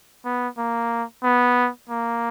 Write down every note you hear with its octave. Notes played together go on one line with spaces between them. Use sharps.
B3
A#3
B3
A#3